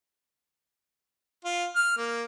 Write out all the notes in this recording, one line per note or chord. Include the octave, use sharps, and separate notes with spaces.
F4
F6
A#3